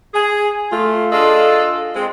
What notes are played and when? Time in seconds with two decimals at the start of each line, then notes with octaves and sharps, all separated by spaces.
0.14 G#4
0.71 A3 F4
1.12 D4 F4 G#4 A4 D#5
1.95 G#3 C4